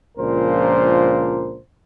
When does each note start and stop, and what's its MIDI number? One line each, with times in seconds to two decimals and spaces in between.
0.18 1.57 37
0.18 1.57 46
0.18 1.57 53
0.18 1.57 62
0.18 1.57 70
0.18 1.57 72